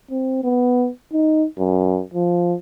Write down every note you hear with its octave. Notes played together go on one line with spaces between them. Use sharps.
C4
B3
D#4
F#2
F3